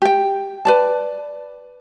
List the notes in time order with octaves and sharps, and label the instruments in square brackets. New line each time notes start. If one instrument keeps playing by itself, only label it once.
[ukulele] G4 G5
B4 D5 A5